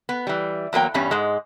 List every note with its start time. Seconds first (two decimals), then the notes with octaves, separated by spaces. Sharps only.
0.09 B3
0.27 E3 G3
0.73 E2 F#3 A#3 G5
0.94 E2 G2 G3 C#4
1.11 G#2 G#3